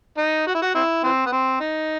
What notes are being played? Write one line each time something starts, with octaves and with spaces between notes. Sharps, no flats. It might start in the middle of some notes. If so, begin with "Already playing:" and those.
D#4
F#4
E4
F#4
C4 E4
E3 C4
B3
C4
D#4